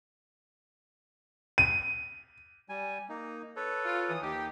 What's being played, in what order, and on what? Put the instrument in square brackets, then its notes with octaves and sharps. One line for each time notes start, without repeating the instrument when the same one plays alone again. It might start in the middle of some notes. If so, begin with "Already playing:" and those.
[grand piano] D#7
[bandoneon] G3 G#5
A#3 D#4
A4 B4 C#5
[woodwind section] F4
E3 D#6
[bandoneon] D#2 D#4 [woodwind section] G4